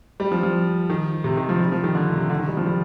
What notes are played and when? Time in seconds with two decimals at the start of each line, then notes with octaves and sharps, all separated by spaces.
0.20 G3
0.32 F3
0.43 F3
0.90 D#3
1.24 C3
1.37 D#3
1.49 F3
1.60 G3
1.72 F3
1.84 D#3
1.95 D3
2.13 C3
2.30 D3
2.39 D#3
2.48 G3
2.57 F3
2.66 G3